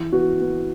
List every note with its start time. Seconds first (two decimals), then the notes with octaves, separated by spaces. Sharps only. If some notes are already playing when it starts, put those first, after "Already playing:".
Already playing: E3
0.12 B3 F#4
0.40 B3